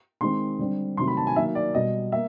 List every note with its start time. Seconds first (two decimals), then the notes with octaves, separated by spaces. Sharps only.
0.21 D#3 G#3 C4 C6
0.59 D3 G3 C4
0.97 C3 D#3 F#3 A3 C4 C6
1.08 B5
1.17 A5
1.27 G#5
1.35 D#3 F#3 A#3 E5
1.55 D5
1.74 B2 G3 B3 D#5
2.12 A#3 E5